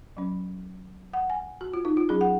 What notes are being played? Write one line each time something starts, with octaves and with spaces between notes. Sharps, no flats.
F#3 C#4
F#5
G#5
F#4
F4
D#4
F4
F#3 C#4 G#4
F#5